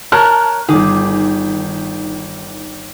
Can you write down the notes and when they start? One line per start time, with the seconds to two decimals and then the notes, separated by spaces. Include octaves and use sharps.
0.12 A#4 C#5 A5 F6 F#6
0.69 G1 D#3 G#4 D6